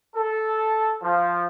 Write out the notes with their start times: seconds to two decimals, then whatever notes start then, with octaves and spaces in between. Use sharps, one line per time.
0.15 A4
1.02 F3